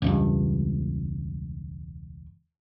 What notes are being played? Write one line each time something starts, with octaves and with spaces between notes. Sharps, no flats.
E1 C#2 G2